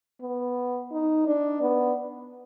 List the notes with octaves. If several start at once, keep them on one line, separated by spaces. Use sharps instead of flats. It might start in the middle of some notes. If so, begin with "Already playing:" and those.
B3
D#4
D4
B3